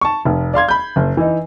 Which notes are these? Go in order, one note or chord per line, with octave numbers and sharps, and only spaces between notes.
A5 C#6
F1
D5 F5 C6 G#6
B5 G6
F#1
E3 D#4